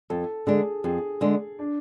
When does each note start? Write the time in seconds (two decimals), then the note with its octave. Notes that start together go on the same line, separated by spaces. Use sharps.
0.10 F2 A4
0.47 D3 G#3 D4 G#4
0.84 F2 G#4
1.21 D3 G#3 D4
1.59 D4